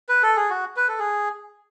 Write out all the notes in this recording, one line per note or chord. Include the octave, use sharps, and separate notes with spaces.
B4
A4
G#4
F#4
B4
A4
G#4